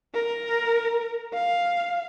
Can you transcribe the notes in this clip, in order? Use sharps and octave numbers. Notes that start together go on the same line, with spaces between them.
A#4
F5